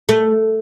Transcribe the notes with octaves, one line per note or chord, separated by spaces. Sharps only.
A3